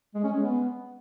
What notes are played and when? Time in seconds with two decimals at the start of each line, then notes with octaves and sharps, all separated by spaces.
0.15 G#3
0.24 C#4
0.33 G#3
0.43 B3